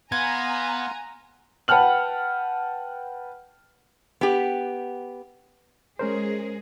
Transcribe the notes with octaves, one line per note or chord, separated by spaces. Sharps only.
B3 F5 F#5 G#5 A#5 C6 G#6
B4 F#5 G5 A5 F6 F#7
B3 G4
G#3 C#4 G#4 A#4 C5